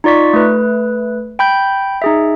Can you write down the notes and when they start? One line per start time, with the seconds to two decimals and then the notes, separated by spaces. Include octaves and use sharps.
0.04 D#4 F4 D5 C#6 B6
0.33 A3 B4
1.39 G5 B5 G6
2.02 D#4 G#4 E5